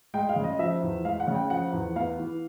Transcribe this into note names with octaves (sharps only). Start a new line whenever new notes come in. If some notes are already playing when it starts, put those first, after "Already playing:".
G#3 G5
F5
C#3
D#5
F3 E5
E2
G#3 F5
F#5
C#3
G5
F3 F#5
E2
B3 F5
E3